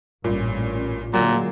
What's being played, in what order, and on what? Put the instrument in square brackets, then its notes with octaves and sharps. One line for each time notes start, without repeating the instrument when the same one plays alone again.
[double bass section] A1 C#4 [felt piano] G2 A#2
[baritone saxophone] A#2 [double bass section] D3 G#3 A#3 [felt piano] F#3